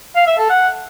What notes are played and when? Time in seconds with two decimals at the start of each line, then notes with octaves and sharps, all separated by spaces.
0.15 F5
0.27 E5
0.38 A4
0.50 F#5